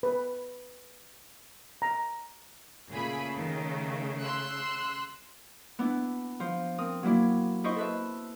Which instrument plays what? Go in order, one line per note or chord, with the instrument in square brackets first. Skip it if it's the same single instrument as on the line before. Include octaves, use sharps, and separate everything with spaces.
[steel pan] B4
A#5
[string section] A#2 G#4 B5 [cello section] C#3 A3
[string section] D#3
C6 E6 F#6
[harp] B3 D4 E4
F3 C5
C4 A#4 D#6
F#3 A#3 E4 D5
E4 C5 D#5 C#6
A4 B4 E5